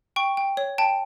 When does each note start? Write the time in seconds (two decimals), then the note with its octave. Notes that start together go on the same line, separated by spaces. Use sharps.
0.16 G5 C#6
0.37 G5
0.57 C#5
0.78 G5 A5